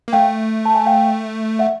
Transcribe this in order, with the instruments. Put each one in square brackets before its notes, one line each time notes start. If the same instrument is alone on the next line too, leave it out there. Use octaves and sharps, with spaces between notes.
[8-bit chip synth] A#3
[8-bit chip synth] A3 [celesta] F5 G5
[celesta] A5
G#5
F5 G5
E5 F#5